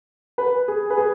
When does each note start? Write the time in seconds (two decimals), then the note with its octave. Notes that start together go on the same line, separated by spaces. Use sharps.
0.38 B4
0.68 G#4
0.90 B4
0.97 G#4